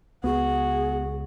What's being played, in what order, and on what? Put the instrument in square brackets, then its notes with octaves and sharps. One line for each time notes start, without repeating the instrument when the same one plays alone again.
[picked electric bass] C#2 [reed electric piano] B3 [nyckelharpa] F#4 [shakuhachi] G#4